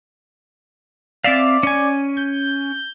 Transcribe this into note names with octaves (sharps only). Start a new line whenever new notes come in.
C4 D5 E5 F5
C#4 G#5
G6